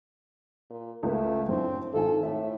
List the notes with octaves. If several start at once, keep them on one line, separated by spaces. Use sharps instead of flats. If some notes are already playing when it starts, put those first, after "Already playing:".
A#2
C#2 A3 A#3 B4
F#2 A2 C4 D4
G#1 F4 A4 G#5
A2 E5